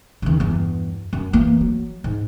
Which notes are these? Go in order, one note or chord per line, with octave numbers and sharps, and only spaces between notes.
D#2 C#3
E2 G2
F#2
E3 A#3
F#3
G#2